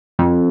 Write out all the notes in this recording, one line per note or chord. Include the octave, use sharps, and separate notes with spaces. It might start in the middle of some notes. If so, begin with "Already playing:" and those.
F2